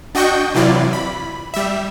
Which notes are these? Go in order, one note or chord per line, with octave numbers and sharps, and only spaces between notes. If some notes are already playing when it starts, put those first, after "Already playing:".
D4 F#4 D#5 G5 C#6 G6
C3 E3 F#3 E4 F4 D5
B5
G3 E5